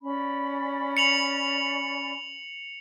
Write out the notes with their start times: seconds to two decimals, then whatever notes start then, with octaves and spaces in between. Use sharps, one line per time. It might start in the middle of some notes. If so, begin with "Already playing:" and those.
0.02 C#4 D5 B5
0.97 C#7 F7 F#7